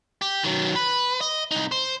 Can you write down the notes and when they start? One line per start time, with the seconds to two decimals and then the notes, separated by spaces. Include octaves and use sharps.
0.22 G4
0.44 D#3 F#3
0.76 B4
1.21 D#5
1.51 C2 D#4
1.72 C5